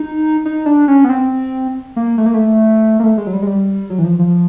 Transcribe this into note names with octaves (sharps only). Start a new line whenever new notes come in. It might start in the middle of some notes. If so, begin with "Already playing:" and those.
Already playing: D#4
D#4
D4
C#4
B3
C4
A#3
A3
A#3
A3
A#3
A3
G#3
F#3
G3
G#3
G3
F#3
E3
F3
F3